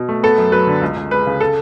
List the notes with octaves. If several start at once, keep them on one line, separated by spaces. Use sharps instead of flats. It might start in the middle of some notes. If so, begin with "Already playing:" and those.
Already playing: B2
A3
B3 A4
F#2
F#3 B4
D3
C#2
C#2
G#3 B4
C#3
A4